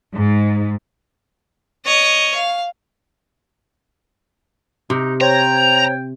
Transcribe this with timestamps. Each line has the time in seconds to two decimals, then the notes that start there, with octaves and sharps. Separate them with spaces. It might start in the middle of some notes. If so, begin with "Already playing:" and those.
0.13 G#2
1.85 C#5 D#5
2.35 F5
4.90 C3 D#4
5.21 C5 C#5 G5 A#5 G#6